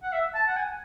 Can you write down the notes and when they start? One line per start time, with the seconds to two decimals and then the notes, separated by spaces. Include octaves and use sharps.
0.03 F#5
0.12 E5
0.35 A5
0.47 F#5
0.57 G#5